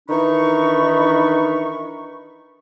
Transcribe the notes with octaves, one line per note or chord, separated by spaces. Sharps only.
D#3 E3 D4 D#4 B5 C#6